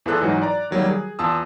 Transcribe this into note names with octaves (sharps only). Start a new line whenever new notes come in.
E2 E3 F4 G#4 A4 F#6
G#2 E3 F#3 D#4 F#4
D5 A#5
D#3 F#3 G3 A#3
G#4
E2 F4 A5 D#6 E6